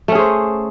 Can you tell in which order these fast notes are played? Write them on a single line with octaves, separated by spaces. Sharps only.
A3 C#4 G#4 C5